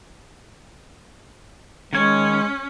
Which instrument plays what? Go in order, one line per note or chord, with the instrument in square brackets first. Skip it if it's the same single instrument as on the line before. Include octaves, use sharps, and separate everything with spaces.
[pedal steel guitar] D#3 C#5 [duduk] G#3 [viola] C#4